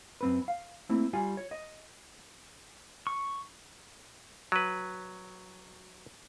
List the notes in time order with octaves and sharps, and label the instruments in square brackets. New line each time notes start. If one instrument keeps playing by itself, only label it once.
[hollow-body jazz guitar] F#2 C4 B4
F5
A3 A#3 C4 E4
G3 F4 G#5
C#5
D#5
[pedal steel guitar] C#6
[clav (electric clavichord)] F#3 B4